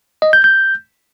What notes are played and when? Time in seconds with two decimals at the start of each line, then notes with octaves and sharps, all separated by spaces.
0.22 D#5
0.33 G6
0.44 G6